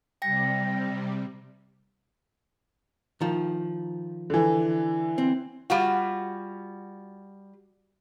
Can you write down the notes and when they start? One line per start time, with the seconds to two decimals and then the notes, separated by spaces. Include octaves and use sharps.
0.22 C3 G3 G5 A#6
3.21 D#3 F3
4.30 D3 E3
5.18 C4
5.70 G3 F4 F#4